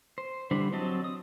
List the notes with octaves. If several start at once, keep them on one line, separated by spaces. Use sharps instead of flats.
C5
D3 E3 G3 D4 C5
F#3 C4 D#5 A5
D#6